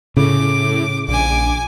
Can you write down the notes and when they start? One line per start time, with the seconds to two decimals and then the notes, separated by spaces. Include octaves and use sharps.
0.17 A2 C#3 D6
1.08 A#1 G#5 D6